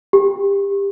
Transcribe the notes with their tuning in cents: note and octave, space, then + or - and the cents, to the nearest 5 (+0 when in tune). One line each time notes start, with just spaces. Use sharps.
G4 +25